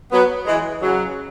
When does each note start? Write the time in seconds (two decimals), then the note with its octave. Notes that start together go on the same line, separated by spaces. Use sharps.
0.12 F#3 B3
0.46 E3 G#3
0.81 C#3 F#3